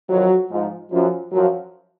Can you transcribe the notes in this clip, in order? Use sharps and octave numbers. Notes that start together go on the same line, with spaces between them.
F2 D#3 F#3
G#2 F3
F#2 F3
F#2 F3 F#3